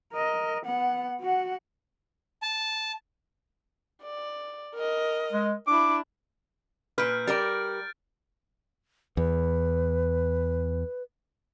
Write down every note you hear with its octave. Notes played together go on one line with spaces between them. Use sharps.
A#4 D#5
B3 F#5
F#4 F#5
A5
D5
A#4 D#5
G#3
D4 E4 D6
A#2 B4 F6 G6 D7
G3 A#4 D5 A6
E2 B4